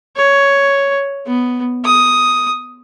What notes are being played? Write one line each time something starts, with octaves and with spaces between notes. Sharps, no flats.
C#5
B3
D#6